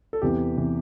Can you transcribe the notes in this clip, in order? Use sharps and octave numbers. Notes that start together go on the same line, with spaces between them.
A4
E2 C3 E3 G4
C3 E3